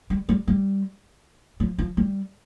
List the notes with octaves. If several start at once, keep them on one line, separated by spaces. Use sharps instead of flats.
G3
G3
G3
F3
F3
G3